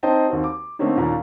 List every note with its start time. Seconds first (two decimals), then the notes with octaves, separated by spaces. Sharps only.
0.03 C4 D#4 C5 D#5 G5 A5
0.28 D#2 C4 F#4
0.44 D6
0.79 D3 A3 A#3 C4 C#4 D#4
0.97 D#2 A#2 E3 C#4 A#5